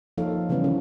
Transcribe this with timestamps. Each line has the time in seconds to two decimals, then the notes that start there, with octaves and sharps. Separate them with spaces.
0.18 F3 A#3 D#4 A4 C#5 F5
0.49 C#3 E3 G3 B3 C#4
0.64 D#3 G#3 C#4